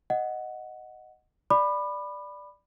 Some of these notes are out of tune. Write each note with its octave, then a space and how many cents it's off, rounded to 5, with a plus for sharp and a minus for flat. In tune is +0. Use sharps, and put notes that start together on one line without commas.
D#5 +0 F#5 +0
D5 +0 B5 +0 D6 +40